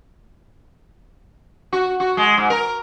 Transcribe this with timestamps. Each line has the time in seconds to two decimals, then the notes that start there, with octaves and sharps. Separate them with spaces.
1.73 F#4
2.00 F#4
2.17 G#3
2.37 G#2
2.50 A#4